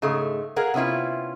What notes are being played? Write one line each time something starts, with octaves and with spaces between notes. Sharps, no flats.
G#2 C#3 G#3 A3
G#4 A#4 F5 F#5
C3 B3 C#4 E4 F4